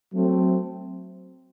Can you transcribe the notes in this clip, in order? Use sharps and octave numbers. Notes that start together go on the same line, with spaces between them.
F#3 A3 C4